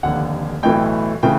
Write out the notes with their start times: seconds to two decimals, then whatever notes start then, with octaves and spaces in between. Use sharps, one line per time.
0.03 F1 D#2 D3 F#5
0.63 B1 A2 E3 A3 G5
1.23 C#3 E3 A3 G5